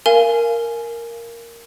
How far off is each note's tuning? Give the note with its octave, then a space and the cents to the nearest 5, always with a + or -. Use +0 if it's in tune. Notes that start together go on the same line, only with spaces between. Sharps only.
A#4 +0 F5 -25 G#5 +10